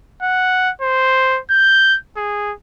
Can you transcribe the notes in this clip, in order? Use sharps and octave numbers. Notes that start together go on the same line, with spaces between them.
F#5
C5
G6
G#4